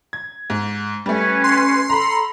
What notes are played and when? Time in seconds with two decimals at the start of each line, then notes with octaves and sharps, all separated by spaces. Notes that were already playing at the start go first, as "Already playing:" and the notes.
0.13 G#6
0.50 G#2
1.06 G3 A3 C#4 B4
1.44 C6
1.89 A4 A#5 B5